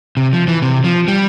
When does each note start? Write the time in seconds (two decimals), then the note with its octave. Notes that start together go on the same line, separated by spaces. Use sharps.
0.17 C3
0.33 F3
0.48 E3
0.62 C3
0.84 F3
1.08 G3